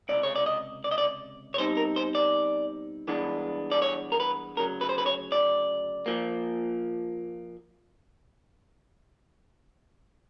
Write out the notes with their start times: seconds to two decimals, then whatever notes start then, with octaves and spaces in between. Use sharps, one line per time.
0.09 C#2 C3 D5
0.23 C#5
0.36 D5
0.46 D#5
0.84 D5
0.91 D#5
0.98 D5
1.54 C#5
1.58 B2 G3 C4 D#4 C5
1.77 A#4
1.96 C5
2.15 D5
3.08 G2 E3 G#3 B3 D4
3.72 D5
3.82 C#5
4.12 A#4
4.20 B4
4.57 D2 C#3 F#3 A#4
4.81 B4
4.89 C5
4.98 B4
5.06 C#5
5.32 D5
6.06 A#2 F3 A#3